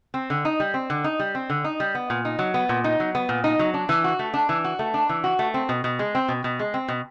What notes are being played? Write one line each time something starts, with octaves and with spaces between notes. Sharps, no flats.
C4
D3
D#4
G3
C4
D3
D#4
G3
C4
D3
D#4
G3
B3
A#2
D#4
F#3
B3
A#2
D#4
F#3
B3
A#2
D#4
F#3
D4
E3
F#4
A3
D4
E3
F#4
A3
D4
E3
F#4
A3
C4
B2
B2
G#3
C4
B2
B2
G#3
C4
B2